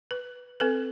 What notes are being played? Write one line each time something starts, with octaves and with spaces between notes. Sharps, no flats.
B4
C4 A4 B4